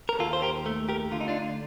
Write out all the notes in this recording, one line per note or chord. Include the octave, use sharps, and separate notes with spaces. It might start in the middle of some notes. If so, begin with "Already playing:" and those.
A#4
D#2 F4 A4
C5
G4 A#4
A3
G4 A#4
D3 F4
D#4
D4 F4